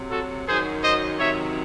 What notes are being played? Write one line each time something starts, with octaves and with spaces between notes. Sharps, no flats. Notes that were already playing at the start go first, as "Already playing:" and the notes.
Already playing: C3 F#3
F#4 A4
F#2 D#3 F#3 G#4 C5
C5 D#5
C3 D#3 F#3 C#5 E5